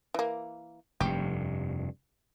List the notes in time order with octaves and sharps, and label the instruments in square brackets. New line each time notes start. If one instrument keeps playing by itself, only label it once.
[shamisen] E3 A#3
[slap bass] F1 G2 [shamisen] G4